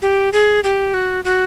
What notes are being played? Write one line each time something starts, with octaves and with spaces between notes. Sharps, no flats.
G4
G#4
G4
F#4
F#4